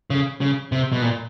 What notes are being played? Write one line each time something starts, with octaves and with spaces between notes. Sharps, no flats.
C#3
C#3
C3
B2
A#2